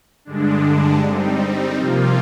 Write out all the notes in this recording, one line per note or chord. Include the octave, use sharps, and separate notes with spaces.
G2 D3 G#3 D4
G3 C4 D#4
C3 F3 A#3 F4